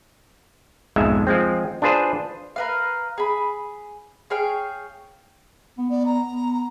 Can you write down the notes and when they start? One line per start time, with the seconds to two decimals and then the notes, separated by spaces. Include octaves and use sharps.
0.96 B1 F2 G#2 G#3 E5
1.27 F3 G#3 C4
1.82 D4 F4 G#4 B4 C5
2.56 A#4 B4 F5
3.18 G#4 B5
4.30 G#4 C#5 F5 G5
5.78 B3
5.90 B3 D5
6.05 A#5
6.27 B3